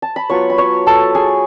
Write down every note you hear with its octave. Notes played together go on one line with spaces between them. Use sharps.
A5
B5
F#3 B3 F4 C#5 C#6
B5
C#5 C#6
A4 A5
G#4 G#5